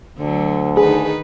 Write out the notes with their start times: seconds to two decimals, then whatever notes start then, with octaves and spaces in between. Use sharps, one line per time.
0.19 D2 D3 F#3
0.77 D#3 D#4 G#4 B4